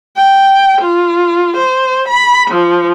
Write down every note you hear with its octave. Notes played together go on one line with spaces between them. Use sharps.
G5
F4
C5
B5
F3